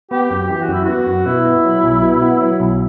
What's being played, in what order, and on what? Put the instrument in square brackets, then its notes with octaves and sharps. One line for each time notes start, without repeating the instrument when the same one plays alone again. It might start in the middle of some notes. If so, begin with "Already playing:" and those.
[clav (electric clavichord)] B3 [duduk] G4
[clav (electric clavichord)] F#2
[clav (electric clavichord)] E3 [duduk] G4
[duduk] F#4
[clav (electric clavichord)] F#2 [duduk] E4
[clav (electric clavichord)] B3 [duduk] F#4
[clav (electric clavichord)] F#2
[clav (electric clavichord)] B2 [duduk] E4
[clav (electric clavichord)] B3
F#3
B1
B2
B3
F#3
B1